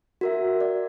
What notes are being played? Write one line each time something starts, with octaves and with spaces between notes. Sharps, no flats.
F#4 A#4 E5
D5